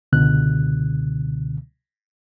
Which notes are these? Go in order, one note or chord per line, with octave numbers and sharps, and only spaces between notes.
C#2 B2 D3 F#6